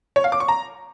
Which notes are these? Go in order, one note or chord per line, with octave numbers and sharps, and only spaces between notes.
C#5
F5
D6
C#6
A#5